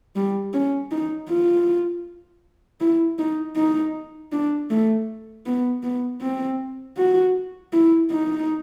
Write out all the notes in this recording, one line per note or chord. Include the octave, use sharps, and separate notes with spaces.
G3
C#4
D#4
F4
E4
D#4
D#4
D4
A3
B3
B3
C4
F#4
E4
D#4